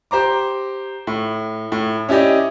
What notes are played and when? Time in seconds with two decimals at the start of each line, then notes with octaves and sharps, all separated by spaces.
0.11 G4 C5 A#5 D6
1.07 A2
1.72 A2
2.09 C#4 E4 G4 D5 D#5